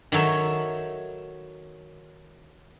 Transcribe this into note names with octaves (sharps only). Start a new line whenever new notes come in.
D#3 F#3 A4 C#5 E5